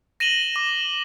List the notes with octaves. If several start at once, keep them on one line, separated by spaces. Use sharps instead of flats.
A#6 D#7 E7 F#7 G7
D6